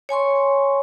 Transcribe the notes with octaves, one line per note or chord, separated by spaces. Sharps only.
C#5 G#5 C6 C#6